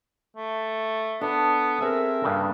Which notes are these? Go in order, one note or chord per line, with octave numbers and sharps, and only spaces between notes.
A3
B3 D4 A4
C4 G#4 A#4 E5 G#5
G2 C#3 A#3 D4